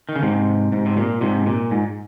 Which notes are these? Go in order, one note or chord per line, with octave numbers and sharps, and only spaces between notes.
D#3
C#3
G#2 C3
G#2
C3
A#2
G#2 C3
A#2
G#2